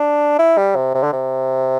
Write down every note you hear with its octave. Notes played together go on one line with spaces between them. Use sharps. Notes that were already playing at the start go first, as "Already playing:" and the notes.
Already playing: D4
E4
G3
C3
C3
D3
C3